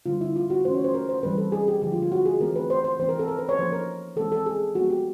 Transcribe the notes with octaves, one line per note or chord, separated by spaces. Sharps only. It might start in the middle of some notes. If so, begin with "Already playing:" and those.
D3 G3 C4 F4
E4
F4
F#4
E3 A3 C#4 C5
C#5
C5
A#4
C5
E3 G3 C4 B4
A4
G#4
G4
D3 F3 G#3 G4
F4
F4
F#4
G#4
E3 A3 C4 A#4
B4
C5
C5
E3 A3 C4 C5
A#4
A4
A#4
B4
C#5
F3 A#3 C#4 C5
A#4
E3 G#3 C4 A4
A4
G#4
F3 G#3 B3 F#4
G4